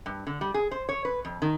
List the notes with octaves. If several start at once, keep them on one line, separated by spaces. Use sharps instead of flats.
G2
D3
G3
G#4
C5
C#5
B4
F2
D#3